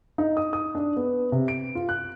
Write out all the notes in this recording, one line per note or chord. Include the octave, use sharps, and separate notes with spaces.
D#4
D#6
D#6
D4
B3
C3
D7
F4
F#6